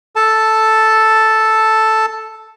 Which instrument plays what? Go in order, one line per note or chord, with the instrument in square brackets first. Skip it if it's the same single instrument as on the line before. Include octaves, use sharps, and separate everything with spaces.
[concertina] A4 A5